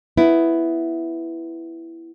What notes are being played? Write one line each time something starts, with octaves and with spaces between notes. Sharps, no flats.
B3 E4